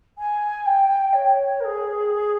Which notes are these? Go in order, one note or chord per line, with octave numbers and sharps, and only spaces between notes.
G#5
G5
C#5
A#4
G#4